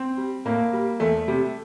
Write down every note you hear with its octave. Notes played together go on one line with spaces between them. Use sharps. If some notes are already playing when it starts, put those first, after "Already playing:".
Already playing: C4
G3
A2 A#3
G3
E2 A3
C3 G3